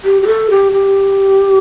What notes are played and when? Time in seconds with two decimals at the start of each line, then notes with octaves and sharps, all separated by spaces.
0.04 G4
0.22 G4
0.27 A4
0.50 G4
0.73 G4